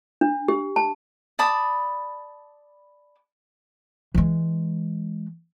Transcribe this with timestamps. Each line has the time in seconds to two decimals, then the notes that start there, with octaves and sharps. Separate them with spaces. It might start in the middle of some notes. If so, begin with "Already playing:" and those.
0.21 D4
0.48 G4
0.76 A5
1.39 D5 A5 B5 D#6
4.14 E3 G#3